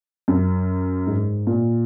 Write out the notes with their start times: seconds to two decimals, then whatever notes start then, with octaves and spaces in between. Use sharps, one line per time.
0.28 F#2
1.07 G#2
1.47 A#2